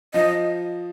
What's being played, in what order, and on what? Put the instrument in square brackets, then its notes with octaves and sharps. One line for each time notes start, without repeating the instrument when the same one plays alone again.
[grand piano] F3 [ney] D#5